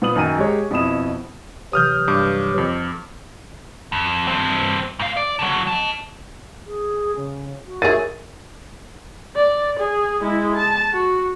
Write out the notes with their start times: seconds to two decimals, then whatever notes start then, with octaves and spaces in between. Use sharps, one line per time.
0.02 A#2 B3 D#6 F#7
0.15 F#2 D#3 G#5 A#5 D#7
0.38 G#3 G4 G#4 C#5
0.71 F2 B2 E4 D#6 E7
1.73 C3 E3 F#3 D#6 F6 G6
2.08 G2 D6
2.58 F2
3.92 F2
4.28 G2 C4
4.99 G#2 F5
5.17 D5
5.39 D3 F#3
5.67 D#5 A5
6.66 G#4
7.16 C#3
7.66 F#4
7.82 D#3 F#3 G#4 A#4 E5 A6 D#7
9.36 D5
9.79 G#4
10.21 G#3 E4
10.55 A5
10.92 F#4